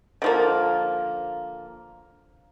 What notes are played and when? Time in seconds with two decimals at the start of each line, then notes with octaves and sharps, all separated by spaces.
0.22 D3 F3 A#3